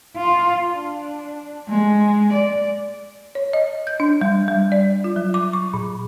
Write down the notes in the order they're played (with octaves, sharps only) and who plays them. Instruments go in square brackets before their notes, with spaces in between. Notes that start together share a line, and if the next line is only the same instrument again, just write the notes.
[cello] F4
D4
G#3
D5
[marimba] C#5
D#5
G6
D4
G3
G3
D5
F4
F#3
D6
C#6
A#2